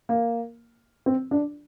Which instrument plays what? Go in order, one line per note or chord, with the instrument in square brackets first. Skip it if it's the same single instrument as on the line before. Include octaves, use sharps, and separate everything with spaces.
[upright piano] A#3
C4
D4